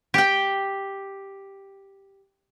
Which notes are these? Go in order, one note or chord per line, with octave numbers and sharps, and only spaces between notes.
G4 G5